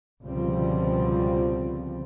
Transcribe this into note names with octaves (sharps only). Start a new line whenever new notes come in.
C#2 B2 D3 F3 G3 C4